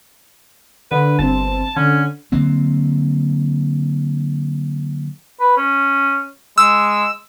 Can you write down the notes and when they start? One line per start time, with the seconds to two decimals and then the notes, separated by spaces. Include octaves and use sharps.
0.91 D3 B4
1.19 G1 C4 A5
1.76 D3 C#4
2.32 D3 F#3 A#3 C4
5.40 B4
5.57 C#4
6.58 G#3 E6